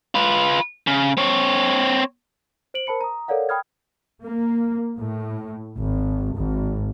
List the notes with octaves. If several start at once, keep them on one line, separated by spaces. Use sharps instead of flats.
F4 B4
C#3
C4 C#5
C5 D7 F#7
A#4 C5 A5 B5 C#7
A#5 D#6
A4 A#4 C#5 D5 F5 F#5
G5 B5 D#6 F6 G#6
A#3
A2
G#1
G#1